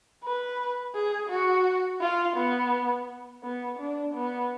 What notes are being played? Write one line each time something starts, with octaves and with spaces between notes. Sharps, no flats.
B4
G#4
F#4
F4
B3
B3
D4
B3